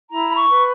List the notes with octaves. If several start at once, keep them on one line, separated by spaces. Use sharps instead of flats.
E4 A#5
B5
C#6
B4